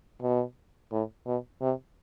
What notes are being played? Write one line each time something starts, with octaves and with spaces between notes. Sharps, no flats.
B2
A2
B2
C3